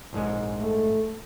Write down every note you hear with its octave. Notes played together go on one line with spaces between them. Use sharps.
A#1 G#2 G#3
A3